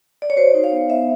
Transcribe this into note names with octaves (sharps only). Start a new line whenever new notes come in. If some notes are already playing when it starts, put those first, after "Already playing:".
D5
C#5
F#4 C5
D#4
F5
B3
B3 E5